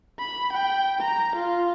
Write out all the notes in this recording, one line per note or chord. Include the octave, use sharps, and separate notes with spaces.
B5
G5
A#5
F4